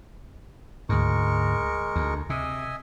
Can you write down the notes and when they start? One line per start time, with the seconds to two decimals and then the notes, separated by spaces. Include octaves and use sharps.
0.89 D2 G#2 G#3 A#4 C#6
1.96 D2
2.30 C3 D#5 E5 G#5